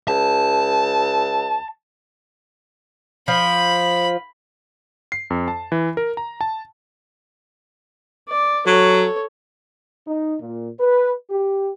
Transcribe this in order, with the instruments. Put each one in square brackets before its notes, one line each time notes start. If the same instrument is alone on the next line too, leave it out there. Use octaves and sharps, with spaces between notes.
[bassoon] C#2 [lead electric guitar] A5
[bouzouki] F3 [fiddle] B5
[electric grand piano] C7
F2
A5
E3
A#4
A#5
A5
[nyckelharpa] D5
[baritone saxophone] F#3 [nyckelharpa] A4 C#5
[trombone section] D#4
A#2
B4
G4